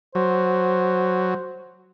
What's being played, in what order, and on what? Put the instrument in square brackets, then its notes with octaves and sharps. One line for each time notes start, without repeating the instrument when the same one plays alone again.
[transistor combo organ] F#3 [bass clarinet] C5